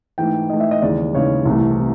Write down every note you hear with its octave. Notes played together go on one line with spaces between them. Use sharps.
G#2 E3 A3 G5
G#2 E3 A3 D#5
E5
D#5
D#2 C#3 E3 G#3 D5
D#2 C#3 E3 G#3 C#5
C2 C3 E3 A3
C3